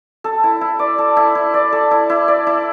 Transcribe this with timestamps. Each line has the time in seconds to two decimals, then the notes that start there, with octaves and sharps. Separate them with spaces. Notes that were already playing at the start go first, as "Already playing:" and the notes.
0.24 A4
0.44 E4
0.61 E4
0.79 D5
0.98 A4
1.17 E4
1.35 E4
1.54 D5
1.72 A4
1.91 E4
2.10 E4
2.28 D5
2.47 E4